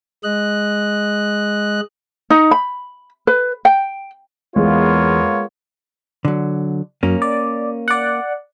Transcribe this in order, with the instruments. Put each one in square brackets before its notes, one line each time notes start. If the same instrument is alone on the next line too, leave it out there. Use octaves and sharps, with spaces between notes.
[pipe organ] G#3 D#5 F#6
[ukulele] D#4
B5
B4
G5
[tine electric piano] E2 [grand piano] G#3 [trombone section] A#3 B3 F4 [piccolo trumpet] C#5
[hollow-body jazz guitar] D3 F#3
[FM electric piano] F#2 [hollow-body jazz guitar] A#3 C#4
[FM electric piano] D5
D5 F#5